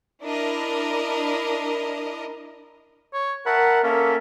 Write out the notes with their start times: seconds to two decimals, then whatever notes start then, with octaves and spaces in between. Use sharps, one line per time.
0.22 D4 E4 A#4 D#5
3.14 C#5
3.46 A#4 E5 F#5 A5 B5
3.84 A#3 C#4 A4 A#4 E5